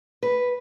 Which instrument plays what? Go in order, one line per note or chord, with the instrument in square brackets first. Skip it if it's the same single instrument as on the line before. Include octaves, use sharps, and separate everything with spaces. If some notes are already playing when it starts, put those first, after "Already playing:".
[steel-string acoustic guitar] B4